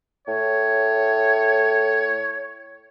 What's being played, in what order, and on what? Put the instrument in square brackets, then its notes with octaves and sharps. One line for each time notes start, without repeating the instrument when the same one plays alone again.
[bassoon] A2 [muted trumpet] C#5